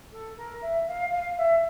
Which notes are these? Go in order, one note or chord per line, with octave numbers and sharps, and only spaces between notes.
A4
A#4
E5
F5
F5
E5